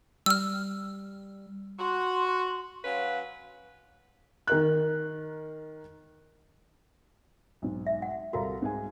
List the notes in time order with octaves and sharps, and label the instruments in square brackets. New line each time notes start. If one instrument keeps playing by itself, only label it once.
[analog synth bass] G3 [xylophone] E6 F6
[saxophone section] F#4 [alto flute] C6
[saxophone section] F#3 C#4 B4 [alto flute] F5
[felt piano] D#3 A#4 F#6
B1 G#2
[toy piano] E5
F#5
[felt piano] C2 A4 A#5 [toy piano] F#4 A#4 F5
[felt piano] G#2 G#4 G#5